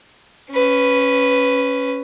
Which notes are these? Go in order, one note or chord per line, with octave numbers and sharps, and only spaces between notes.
C#4 B4